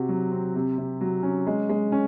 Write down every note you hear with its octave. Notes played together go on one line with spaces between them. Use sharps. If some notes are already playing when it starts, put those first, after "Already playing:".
Already playing: C3 F#4
F#3
C4
C3
C3
F#3
C#4
G#3
G#3
C#4